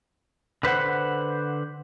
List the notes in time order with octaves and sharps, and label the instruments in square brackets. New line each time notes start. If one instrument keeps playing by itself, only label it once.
[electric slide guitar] D3 B4 C5 F#5